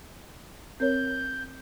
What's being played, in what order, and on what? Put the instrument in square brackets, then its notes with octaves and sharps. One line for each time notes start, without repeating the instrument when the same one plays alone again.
[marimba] C4 A#4 C#5 [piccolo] G6